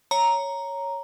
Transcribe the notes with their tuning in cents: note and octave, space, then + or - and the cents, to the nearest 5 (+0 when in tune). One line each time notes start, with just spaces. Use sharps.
C#5 +0 A#5 +0